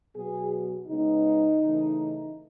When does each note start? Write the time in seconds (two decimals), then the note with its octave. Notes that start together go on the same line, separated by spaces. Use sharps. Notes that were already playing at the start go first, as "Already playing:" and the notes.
0.14 B2 F#3 B3 G#4
0.87 C#3 G#3 B3 D#4
1.61 C#3 E3 A3